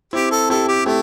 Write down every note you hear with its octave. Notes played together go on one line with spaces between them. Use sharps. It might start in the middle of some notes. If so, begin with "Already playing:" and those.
C4 E4 G4
A4
E4 G4 A4
G4
A3 E4 G4